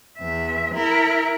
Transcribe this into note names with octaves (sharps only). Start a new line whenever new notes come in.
E2 E5
E4 A#4